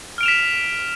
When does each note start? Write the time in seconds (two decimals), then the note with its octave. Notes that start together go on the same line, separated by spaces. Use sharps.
0.18 F6
0.21 D7
0.23 F7
0.26 E7
0.28 B6